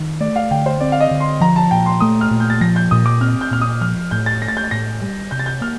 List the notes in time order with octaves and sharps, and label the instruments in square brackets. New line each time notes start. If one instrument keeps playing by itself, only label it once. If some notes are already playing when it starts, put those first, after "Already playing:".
Already playing: [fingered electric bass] D#3
[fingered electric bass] A3 [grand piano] D5
[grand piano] F5
[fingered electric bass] D3 [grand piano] G5
[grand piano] C5
[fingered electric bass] C4 [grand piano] D5
[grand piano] F5
D#5
[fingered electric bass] D3
[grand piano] C6
[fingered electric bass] F3 [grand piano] A#5
[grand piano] A5
[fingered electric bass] A#2 [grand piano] G5
[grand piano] C6
[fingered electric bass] A3 [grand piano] D#6
[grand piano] F6
[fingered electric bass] A#2
[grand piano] G6
A6
[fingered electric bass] F3 [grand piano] A#6
[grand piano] G6
[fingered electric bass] A#2 [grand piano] D#6
[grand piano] D6
[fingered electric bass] C4 [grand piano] F6
[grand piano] G6
[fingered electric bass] A#2 [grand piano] F6
[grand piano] D#6
[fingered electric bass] F3 [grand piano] F6
[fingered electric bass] A2 [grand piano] G6
[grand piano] A6
[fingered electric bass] A3 [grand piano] A#6
[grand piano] A6
G6
A6
[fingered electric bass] A2 [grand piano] A#6
[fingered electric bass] G3
[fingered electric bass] C3 [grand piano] G6
[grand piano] A6
G6
[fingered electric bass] A#3 [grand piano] F6